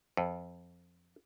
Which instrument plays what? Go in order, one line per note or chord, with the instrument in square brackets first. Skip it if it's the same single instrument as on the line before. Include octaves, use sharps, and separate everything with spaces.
[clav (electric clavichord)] F2